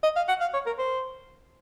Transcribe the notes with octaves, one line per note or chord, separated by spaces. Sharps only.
D#5
F5
F#5
F5
C#5
A#4
C5